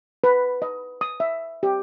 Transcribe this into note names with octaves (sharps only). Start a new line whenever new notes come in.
B4
D#5
D#6
E5
G4